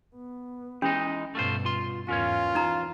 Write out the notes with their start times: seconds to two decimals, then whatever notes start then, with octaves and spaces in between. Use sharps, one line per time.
0.16 B3
0.82 E3 G#3 C#4 D#4
1.35 G2 B2 A3 F4 C5
1.65 F4 C6
2.08 E2 G#2 C#4 F4 A#4 C#5
2.55 E3 D#4 A#5